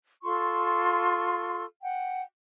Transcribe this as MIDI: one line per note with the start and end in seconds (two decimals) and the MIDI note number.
0.24 1.64 65
0.24 1.64 69
0.24 1.64 84
0.24 1.64 85
1.82 2.24 78
1.82 2.24 79